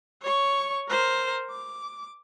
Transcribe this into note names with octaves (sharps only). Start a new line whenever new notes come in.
C#5 C#6
A#4 C5
D6